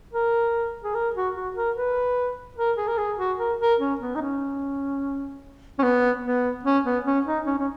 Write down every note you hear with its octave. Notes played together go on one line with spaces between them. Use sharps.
A#4
G#4
A#4
F#4
F#4
A#4
B4
A#4
G#4
A#4
G#4
F#4
A#4
A#4
C#4
B3
D#4
C#4
C#4
B3
B3
C#4
B3
C#4
D#4
C#4
C#4